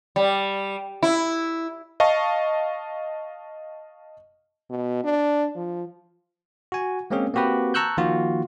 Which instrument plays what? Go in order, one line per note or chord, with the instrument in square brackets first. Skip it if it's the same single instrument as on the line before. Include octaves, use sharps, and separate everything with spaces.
[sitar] G3
E4
[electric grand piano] D#5 F5 A5 C#6
[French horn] B2
D4
F3
[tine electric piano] F#4 G#5
G#3 A#3 C4 C#4 G#4
A#3 C4 F#4 G4 B4
A5 A#5 C#6 E6 F#6 G6
D#3 F3 A#3 F4 F#4